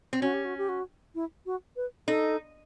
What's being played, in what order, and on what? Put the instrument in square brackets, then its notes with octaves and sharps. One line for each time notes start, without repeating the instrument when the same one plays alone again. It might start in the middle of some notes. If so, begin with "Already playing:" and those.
[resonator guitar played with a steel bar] C4
[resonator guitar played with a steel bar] C#4 [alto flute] F#4
[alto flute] G4
F#4
G4
F#4
E4
F#4
B4
[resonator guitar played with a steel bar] D#4 [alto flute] A4